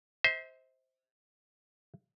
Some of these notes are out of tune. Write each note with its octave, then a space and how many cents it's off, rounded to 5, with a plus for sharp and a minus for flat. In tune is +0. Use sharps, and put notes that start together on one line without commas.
C5 +0 E5 -45